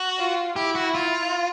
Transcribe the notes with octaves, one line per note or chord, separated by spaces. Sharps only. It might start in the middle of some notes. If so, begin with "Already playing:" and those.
Already playing: F#4
F4
E4 G4
F#4
F4